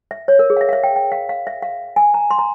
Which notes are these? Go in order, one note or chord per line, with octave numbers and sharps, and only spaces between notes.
E5
C#5
A#4
G#4
F5
E5
F5
E5
G5
G5
F5
F5
E5
F5
G#5
A#5
C6
A#5